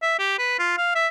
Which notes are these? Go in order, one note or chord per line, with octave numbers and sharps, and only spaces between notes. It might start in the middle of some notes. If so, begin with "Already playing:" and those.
E5
G4
B4
F4
F5
E5